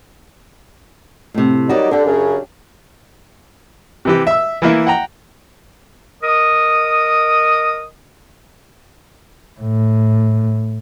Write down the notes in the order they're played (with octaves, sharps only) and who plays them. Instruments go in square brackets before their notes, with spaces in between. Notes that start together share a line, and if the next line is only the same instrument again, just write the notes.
[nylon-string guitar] A2 C3
[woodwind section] F#3 G3 D#4 [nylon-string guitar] F#4 A#4 D5
[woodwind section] D3 [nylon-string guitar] D4 G4
[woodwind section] F#2 C#3
[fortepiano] C3 E3 G4
E5 E6
E3 A#3 E4
F#5 G5 A#5
[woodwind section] A#4 D#5 D#6
[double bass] A2